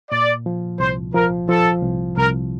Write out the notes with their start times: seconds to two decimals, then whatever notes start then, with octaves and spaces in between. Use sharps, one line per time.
0.10 A#2 D5
0.46 F3
0.79 C2 C5
1.14 F3 A#4
1.49 F3 A4
1.83 C2
2.17 C2 A#4